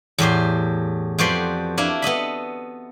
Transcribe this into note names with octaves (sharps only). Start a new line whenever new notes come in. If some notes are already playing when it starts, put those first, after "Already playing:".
E2 A2 G4 C6
F2 B3 F#4 G4 D5 C6
A#3 D4 E4
B3 A4 D#5 B5